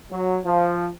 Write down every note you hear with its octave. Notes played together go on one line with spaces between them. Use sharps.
F#3
F3